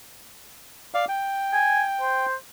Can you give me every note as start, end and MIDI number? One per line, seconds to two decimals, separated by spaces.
0.94 1.05 74
0.94 1.05 77
1.09 2.26 79
1.53 1.83 80
2.00 2.34 72